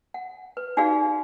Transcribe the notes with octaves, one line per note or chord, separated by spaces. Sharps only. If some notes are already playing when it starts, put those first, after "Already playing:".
F#5
B4
D#4 F#4 G#4 D5 F5